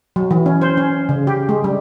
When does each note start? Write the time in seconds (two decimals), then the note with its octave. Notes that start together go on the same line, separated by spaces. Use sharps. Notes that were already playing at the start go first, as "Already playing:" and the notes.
0.16 F#3
0.31 E3
0.46 C#4
0.62 C5
0.77 C#4
1.09 C#3
1.27 G4
1.49 G#3
1.64 G3